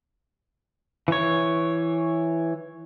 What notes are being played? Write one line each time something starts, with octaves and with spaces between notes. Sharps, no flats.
E3 C#5